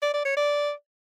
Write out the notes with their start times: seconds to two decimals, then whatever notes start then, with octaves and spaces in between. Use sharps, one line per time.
0.02 D5
0.14 D5
0.25 C#5
0.37 D5